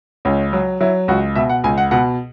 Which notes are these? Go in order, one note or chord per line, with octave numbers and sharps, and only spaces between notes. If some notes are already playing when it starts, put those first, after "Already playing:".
C#2 C#4
F#3
F#3 E4
C#2 F#4
B2 E5
F#5
C#2 G#5
F#5
B2 F#5